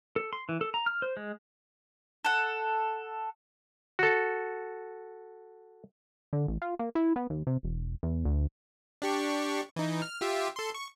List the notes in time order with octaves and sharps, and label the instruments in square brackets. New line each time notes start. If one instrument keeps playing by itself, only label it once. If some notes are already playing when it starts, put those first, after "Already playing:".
[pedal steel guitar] A4
C6
E3
A4
A#5
F6
C5
G#3
[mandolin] A4 F#5
[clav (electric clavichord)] F#4 A4
[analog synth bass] D3
A1
F4
A#3
E4
B3
D#2
C3
E1
E2
D2
[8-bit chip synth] D4 G4 C#6
E3 D#4
F6
F4 G4 E5
A4 C6
C#6